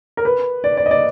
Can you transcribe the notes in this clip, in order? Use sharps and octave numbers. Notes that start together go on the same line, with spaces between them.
A#4
B4
D5
D5
D#5
D5